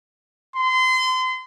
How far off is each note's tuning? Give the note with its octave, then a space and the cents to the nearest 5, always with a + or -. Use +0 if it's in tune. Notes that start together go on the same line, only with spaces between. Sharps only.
C6 -30